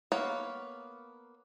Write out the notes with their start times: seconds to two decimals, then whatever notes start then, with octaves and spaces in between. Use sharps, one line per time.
0.12 A#3 B3 C#5 F5